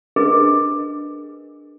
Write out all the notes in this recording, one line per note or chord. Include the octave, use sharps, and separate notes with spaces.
D4 G#4 A#4 B4 D#5